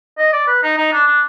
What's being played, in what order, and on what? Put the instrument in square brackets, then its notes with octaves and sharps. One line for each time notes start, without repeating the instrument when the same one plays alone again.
[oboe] D#5
D5
B4
D#4
D#4
D4
D4